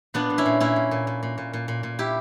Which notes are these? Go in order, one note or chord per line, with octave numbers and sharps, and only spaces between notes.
A#2 B3 D4
A#2
C#4 E4
A#2
A#2 C#4 E4
A#2
A#2
A#2
A#2
A#2
A#2
A#2
A#2
E4 G4